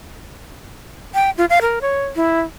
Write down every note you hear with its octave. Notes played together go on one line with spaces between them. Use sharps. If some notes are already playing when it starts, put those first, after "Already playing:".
G5
F4
F5
A#4
C#5
E4